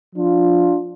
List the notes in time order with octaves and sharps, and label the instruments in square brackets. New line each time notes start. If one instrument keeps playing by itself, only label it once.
[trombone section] F3 D4 F4